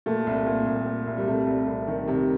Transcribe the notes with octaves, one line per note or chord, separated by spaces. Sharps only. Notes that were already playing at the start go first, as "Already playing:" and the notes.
A#2 A3
C2
A#2
C2
A#2
C2
G3
C3 A3
C2
C2
D#3
C3